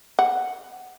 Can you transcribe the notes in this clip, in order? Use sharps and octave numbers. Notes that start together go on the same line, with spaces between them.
F#5